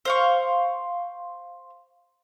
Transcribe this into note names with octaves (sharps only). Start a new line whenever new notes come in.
C5 F5 C#6